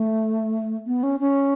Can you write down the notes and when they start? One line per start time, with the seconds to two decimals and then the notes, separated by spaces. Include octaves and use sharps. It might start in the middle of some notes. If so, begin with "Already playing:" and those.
Already playing: A3
0.86 B3
1.03 C#4
1.20 C#4